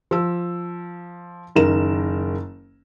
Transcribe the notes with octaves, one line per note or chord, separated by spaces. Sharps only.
F3 E6
F#1 D#3 A#4 E7